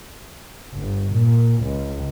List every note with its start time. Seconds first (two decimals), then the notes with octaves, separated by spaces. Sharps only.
0.76 G1
1.14 A#2
1.63 C#2